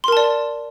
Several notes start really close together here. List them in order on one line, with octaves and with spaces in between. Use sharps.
C6 A#4 A5 D5